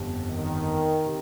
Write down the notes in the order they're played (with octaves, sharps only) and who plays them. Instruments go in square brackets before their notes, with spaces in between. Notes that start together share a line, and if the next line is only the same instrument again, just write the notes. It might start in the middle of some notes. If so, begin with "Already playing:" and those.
Already playing: [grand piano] G1 F2 C3
[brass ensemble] D#3
[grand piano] C3